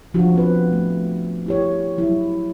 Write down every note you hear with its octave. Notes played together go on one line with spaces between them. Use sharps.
F3 D4 F4 F#4
B3 C4 B4
A3
E4 G4 C#5
F#3 E4